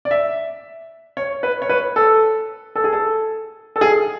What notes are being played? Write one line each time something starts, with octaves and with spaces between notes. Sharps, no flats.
D5
E5
C#5
B4
C#5
B4
A4
A4
G#4
A4
A4
G#4